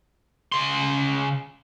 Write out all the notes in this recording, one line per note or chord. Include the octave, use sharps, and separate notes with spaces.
C#3 C6